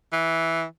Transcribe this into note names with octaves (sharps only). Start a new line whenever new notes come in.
E3